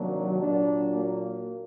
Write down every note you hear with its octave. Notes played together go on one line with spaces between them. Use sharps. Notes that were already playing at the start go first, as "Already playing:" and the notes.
Already playing: C3 D#3 F#3 A#3 D4
A#2 F#3 A#3 D4
A#3